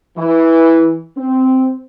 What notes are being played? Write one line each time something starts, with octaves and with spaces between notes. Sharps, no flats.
E3
C4